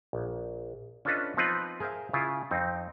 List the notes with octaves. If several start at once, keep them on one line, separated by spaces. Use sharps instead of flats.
A#1
C#4 D4 F4 A4 B4 D#5
F3 B3 C4 D#4 F4 B4
G#4 A#4 C5 E5 F5
C#3 E4 F4
F2 C4 D#4